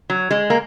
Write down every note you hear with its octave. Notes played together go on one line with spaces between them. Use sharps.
F#3
G#3
A#3